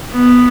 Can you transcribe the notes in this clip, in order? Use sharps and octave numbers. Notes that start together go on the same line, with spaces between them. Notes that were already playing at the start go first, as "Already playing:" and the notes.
B3